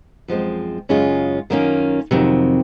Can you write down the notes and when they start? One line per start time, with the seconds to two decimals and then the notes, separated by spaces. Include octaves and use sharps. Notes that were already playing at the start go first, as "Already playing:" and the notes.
0.28 F#2 F3 G#3 C4
0.89 F#2 C#3 G#3 C#4 F4
1.50 F#2 D#3 A#3 C#4 F4
2.11 F2 C3 D#3 F#3